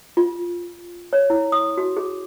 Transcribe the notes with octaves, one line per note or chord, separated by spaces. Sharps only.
F4
C#5
E4
D#6
F#4
G#4